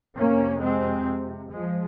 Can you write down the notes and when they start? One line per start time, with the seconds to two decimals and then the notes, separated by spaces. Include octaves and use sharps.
0.18 F2 C3 A#3 C#4
0.63 G#3 C4
1.52 F3 G#3